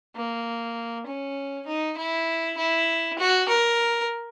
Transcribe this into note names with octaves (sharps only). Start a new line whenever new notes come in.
A#3
C#4
D#4
E4
E4
F#4
A#4